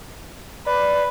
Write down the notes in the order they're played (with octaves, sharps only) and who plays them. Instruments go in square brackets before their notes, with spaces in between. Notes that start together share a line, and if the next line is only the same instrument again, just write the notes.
[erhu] B4 [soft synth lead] D5